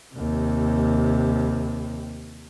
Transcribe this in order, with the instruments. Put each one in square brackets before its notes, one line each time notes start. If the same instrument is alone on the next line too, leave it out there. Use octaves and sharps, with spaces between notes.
[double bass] D#2 C3